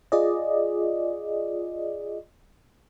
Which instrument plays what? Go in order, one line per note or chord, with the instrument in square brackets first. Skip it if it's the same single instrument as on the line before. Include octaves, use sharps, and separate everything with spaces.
[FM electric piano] F4 G#4 D5 D#5